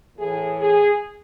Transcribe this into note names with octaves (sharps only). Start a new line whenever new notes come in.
A2 E3 G#4
G#4